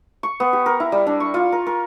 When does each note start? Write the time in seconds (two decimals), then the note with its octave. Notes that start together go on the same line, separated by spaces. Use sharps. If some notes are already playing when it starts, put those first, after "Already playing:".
0.23 C#6
0.40 B3
0.53 G4
0.66 A#4
0.80 E4
0.92 G3
1.07 D4
1.20 C#6
1.34 F4
1.52 A#4
1.66 A#4